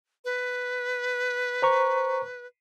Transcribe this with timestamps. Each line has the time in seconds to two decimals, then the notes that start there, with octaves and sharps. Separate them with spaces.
0.25 B4
1.62 C5 A#5 C#6